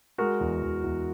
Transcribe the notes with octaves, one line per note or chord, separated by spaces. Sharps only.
G#3 F#4 A#4
E2
E2
E2